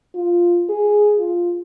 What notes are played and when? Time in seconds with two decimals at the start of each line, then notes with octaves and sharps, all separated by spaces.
0.15 F4
0.69 G#4
1.19 F4